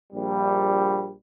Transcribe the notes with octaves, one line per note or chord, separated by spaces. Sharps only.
A#1 G3